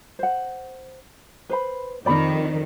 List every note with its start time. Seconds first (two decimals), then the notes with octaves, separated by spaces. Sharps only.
0.19 C5 F#5
1.50 B4 C5 B5
2.05 F2 D#3 C5 D5 B5